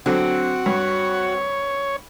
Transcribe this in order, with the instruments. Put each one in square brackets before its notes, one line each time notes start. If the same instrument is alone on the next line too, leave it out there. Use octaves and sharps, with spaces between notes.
[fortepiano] D3 F#3 [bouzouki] C4 [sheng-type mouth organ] F#4 F#5
[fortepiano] G2 [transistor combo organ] C#5